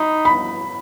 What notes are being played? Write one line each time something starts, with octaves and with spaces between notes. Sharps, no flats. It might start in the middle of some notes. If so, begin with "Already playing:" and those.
Already playing: D#4 B5
B5